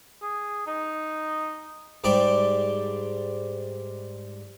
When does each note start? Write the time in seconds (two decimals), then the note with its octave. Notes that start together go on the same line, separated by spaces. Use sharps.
0.22 G#4
0.67 D#4
2.04 G#2 G3 D5 G5